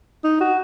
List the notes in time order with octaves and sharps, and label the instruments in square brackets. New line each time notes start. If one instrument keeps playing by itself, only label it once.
[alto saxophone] D#4
F#4